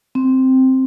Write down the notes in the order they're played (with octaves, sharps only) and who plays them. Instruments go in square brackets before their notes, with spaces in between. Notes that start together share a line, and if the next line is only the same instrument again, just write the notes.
[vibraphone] C4